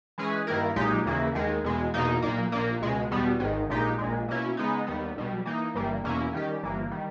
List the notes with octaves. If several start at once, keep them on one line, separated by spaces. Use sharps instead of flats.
E3 G#3 C#4 G#4 B4
G2 D#3 A#3 E4 A#4
B1 A#2 G#3 D#4 G4
D#2 C#3 E3 A#3 E4
D#2 D#3 G#3
E2 B2 G#3
E2 B2 A#3 D#4
B1 A#2 A#3
A#1 A#2 A#3
C#2 B2 G#3
E2 B2 G3 B3
G#1 G#2 D#3
A#1 A#2 G#3 D#4 G4
A#1 A#2 G#3
B2 A#3 C#4 E4
C#3 G#3 B3 D#4
D#2 D#3 G3 B3
B1 B2 G3
E3 A#3 D#4
G1 G2 E3 G3 A#3
E2 B2 A#3 C#4 E4
D#3 G3 C#4 G4
G1 G2 E3 A#3
D#3 G3